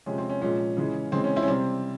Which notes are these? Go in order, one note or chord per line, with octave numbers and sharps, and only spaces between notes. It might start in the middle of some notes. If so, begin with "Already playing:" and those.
C3 F3 G#3 C#4
C4
C#4
A#2 F3 G#3 C#4
C#3 E3 G#3
C#3 E3 G#3 C4
C#4
C4 E4
C#4
C3 G3 C4